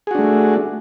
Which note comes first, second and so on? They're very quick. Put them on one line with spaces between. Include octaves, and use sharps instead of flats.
G#4 F#4 D4 A3